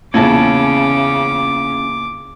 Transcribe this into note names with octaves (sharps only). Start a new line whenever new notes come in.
A#1 E2 C#3 C#4 E4 A5 D6